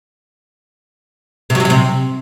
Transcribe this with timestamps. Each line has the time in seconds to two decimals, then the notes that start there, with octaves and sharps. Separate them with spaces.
1.50 C3
1.55 F#3
1.60 C3
1.65 F#3
1.70 C3